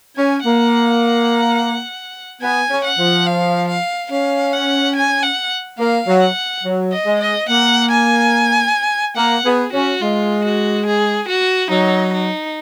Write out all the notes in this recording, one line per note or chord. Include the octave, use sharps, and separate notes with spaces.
C#4 G#5
A#3 F#5
B3 G#5
C#4
F#5
F3
F5
F5
C#4 F5
F#5
G#5
F#5
A#3 F5
F#3
F#5
F#3
D#5
G#3
D#5
A#3 F#5
G#5
A#3 F#5
B3 G#4
C#4 F#4
G#3 F4
F#4
G#4
F#4
F#3 D#4
D#4